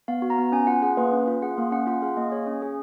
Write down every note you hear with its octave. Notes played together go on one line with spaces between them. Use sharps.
B3 F5
F#4
A#5
B3
C#4 G#5
F4 F#5
G#4 F#5
A#3 B4
C#4
F4
G#4 F#5
A#3 F5
C#4 F#5
F4 F#5
G#4 F5
A#3 D#5
G#4 C#5
C#4
G#4